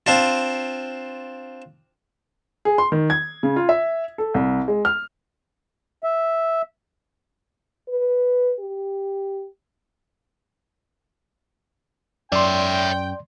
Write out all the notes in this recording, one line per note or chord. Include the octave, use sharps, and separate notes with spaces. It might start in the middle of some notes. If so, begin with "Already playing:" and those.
C4 D4 F4
G#4
C6
D#3
G#6
C#3
F4
E5
A4
C2
G#3
F6
E5
B4
G4
F#2 C#5 D5 E5 G5 C6